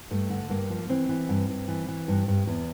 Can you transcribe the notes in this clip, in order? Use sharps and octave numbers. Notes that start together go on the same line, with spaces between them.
G2 A3
D3
G2 A#3
F3
E3 C4
E3
G2
G2
E3
E3
G2
G2
E2